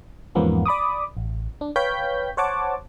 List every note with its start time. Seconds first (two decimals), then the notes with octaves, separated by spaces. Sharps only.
0.35 E2 G#2 F3 A#3 B3 C#4
0.66 D5 B5 D6 D#6
1.17 A1
1.61 D4
1.76 B4 C#5 F5 G5 G6 B6
2.37 C5 C#5 F#5 A5 D6